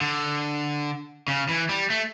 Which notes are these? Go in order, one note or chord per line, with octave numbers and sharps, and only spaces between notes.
D3
C#3
E3
G3
A3